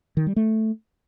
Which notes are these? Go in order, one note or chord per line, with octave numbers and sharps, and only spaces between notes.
D#3
G3
A3